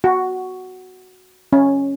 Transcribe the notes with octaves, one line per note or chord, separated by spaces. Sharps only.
F#4
C#4